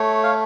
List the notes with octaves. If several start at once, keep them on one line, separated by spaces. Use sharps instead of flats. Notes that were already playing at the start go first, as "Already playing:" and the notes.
Already playing: A3 C#5
F5